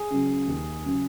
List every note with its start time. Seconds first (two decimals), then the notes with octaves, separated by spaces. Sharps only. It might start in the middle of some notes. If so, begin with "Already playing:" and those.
Already playing: G#4
0.11 C#3 F#3
0.48 D#2
0.85 C#3 F#3